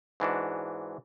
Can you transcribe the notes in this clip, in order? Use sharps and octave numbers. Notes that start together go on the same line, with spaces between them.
G#2 E3 D4 F#4